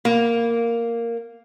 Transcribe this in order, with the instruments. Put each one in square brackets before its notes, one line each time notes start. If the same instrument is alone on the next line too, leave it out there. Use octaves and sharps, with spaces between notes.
[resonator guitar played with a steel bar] A#3